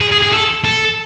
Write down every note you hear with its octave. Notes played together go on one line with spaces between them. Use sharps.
G#4
G#4
G#4
A4
A4